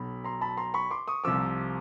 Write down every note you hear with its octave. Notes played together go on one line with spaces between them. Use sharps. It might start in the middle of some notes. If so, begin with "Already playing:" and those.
Already playing: B1 B2 B5
A#5 C6
A5 B5
A#5 C6
B5 C#6
C6 D6
C#6 D#6
C2 C3 F3 D6 E6